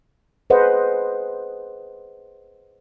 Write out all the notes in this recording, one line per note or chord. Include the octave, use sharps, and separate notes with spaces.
G#4 B4 C5 D#5 F#5